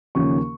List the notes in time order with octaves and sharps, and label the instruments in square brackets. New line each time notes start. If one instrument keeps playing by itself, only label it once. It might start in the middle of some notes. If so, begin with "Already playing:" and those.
[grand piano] D#2 C#3 F3 A#3 C#4 C#6